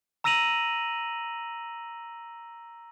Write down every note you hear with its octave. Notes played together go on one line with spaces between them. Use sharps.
A#5 E6 A#6 D#7 F7 F#7